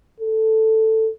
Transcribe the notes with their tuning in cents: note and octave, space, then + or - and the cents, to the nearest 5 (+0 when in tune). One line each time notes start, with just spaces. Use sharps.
A4 +5